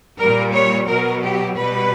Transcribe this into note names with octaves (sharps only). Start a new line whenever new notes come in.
A#2 G3 A#4
C#5
B2 F#3 A#4
G4
B2 G3 B4